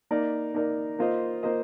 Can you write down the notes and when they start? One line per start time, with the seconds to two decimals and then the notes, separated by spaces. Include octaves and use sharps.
0.11 A#3 D#4 A#4 D5
0.54 A#3 D#4 A#4 D5
0.99 A#3 F4 C5 D#5
1.43 A#3 F4 C5 D#5